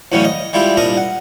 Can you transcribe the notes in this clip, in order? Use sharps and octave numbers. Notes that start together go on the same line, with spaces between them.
E2 A2 C#3 F#3 G3 C#4
D#5
G3 G#3 E4 F4 G4
C2 A#2 D4 A#4 A#5 D#6
F#5